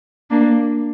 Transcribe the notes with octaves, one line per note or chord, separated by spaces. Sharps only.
A#3 D4